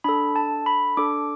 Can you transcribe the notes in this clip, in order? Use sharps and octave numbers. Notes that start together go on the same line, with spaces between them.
D4 A4 B5
A5
B5
D4 A4 D6